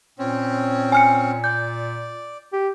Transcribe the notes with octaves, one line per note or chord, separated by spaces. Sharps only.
A#2 C4 C#4
G#5 F6 C#7
D5 G6
G4